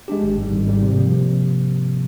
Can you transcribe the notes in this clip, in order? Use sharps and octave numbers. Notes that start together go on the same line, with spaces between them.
G#3 D4 G4
G#1
G#2 G3
G#1
G#2 G3
C3
F3 A#3
C3